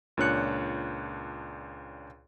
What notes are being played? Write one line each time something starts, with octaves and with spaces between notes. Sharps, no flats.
C#2 A#2 D4 C#5 F#6 C#7